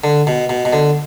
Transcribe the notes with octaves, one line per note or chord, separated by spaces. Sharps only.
D3
B2
B2
B2
D3